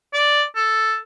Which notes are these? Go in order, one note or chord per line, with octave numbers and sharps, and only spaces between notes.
D5
A4